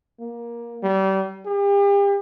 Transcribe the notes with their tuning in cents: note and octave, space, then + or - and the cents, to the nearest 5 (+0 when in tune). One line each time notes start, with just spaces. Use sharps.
A#3 +15
G3 -30
G4 +40